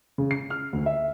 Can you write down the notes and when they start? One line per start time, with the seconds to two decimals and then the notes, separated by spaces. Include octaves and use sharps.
0.18 C#3
0.31 C7
0.50 F6
0.73 D2
0.86 E5